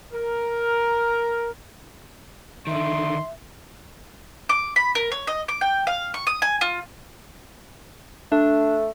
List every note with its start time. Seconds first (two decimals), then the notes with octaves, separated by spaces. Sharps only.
0.13 A#4
2.67 D3 D#3 E5 C6
4.49 D6
4.76 B5
4.95 A#4
5.12 C#5
5.27 D#5
5.48 D6
5.61 G5
5.87 F5
6.14 C#6
6.27 D#6
6.42 G#5
6.61 F4
8.32 A3 D4